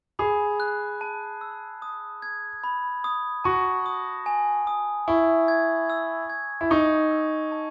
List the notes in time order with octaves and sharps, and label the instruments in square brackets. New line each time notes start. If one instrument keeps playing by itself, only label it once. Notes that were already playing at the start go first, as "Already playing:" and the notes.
[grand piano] G#4 [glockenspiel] B5
[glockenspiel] F#6
A5
E6
D#6
G#6
B5
D#6
[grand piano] F#4 [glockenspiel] A5
[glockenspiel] D#6
G#5
D#6
[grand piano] E4 [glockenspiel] C#6
[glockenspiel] G#6
E6
G#6
[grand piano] E4
[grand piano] D#4 [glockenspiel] C#6
[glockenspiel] E6
A5